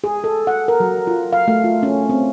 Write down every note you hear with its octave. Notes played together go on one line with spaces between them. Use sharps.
G#4
A4
F#5
A#4
F#3
F4
F5
A3
F4
C#4
C4